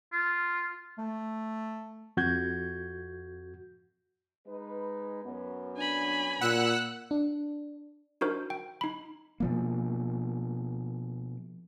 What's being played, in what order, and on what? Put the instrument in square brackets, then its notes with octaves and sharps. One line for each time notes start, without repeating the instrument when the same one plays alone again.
[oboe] F4
[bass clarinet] A3
[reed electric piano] F2 F#4 G6 G#6
[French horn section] G#3 D#4 B4
F#2 B3
[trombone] D4 [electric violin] G#5 B5
[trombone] A#2 [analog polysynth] F#5 E6 F#6
[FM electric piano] D4
[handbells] D4 D#4 F#4 A#4 C5
G5
D#4 B5
[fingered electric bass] B2 F3 A#3